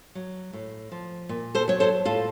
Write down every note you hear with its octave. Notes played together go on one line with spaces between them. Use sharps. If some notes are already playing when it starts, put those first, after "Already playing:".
F#3
A2
F3
A#2
A4 C5
F#3 C#5
A4 C5
A2 F4 A4